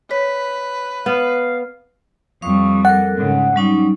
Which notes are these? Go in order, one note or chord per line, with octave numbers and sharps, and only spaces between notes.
B4 C#5 B6
B3 F5
F2 G3 F5 C#6 D#6
A4 A#4 F#5
G#2 C#3
F#3 G3 C#4 D#4